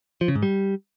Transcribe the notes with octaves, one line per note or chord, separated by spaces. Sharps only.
F3
C#3
G#2
G3